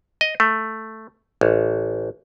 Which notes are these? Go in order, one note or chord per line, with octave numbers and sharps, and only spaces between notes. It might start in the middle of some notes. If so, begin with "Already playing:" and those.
D#5
A3
A1